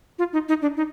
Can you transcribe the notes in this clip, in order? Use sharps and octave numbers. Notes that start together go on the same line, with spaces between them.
F4
D#4
D#4
D4
D#4